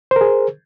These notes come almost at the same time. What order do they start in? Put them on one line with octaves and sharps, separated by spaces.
C5 A#4 G#4